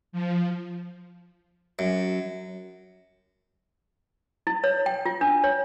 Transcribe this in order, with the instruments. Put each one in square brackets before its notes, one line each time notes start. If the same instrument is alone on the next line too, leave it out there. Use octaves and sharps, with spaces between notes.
[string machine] F3
[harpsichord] F#2
[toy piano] E4
C#5
G5
F4
D4
C#5